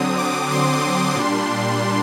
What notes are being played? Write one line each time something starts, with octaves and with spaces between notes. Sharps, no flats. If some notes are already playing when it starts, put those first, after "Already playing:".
Already playing: D3 F#3 C4 D#6
D6
C6
A#2 G3 D4